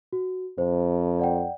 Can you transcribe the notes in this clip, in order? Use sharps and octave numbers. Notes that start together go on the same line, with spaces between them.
F#4
F2 C5
D5 F#5 G5